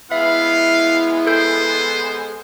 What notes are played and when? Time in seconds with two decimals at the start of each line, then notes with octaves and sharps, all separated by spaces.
0.11 G#3 B3 E4 E5 F5
1.27 A4 C5 G6